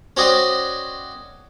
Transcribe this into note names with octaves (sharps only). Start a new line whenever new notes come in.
C#4 F#4 C5 D5 D#5 G5